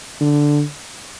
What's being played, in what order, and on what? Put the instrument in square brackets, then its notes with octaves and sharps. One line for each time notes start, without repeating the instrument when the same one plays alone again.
[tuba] D3